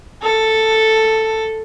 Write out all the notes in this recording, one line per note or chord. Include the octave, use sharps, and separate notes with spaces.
A4